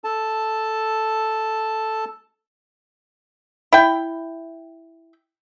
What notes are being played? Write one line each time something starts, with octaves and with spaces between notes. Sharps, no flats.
A4 A5
E4 G5